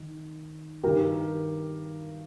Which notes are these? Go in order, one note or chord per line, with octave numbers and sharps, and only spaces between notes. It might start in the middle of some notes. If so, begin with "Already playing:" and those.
Already playing: D#3
G2 D#3 G4 A#4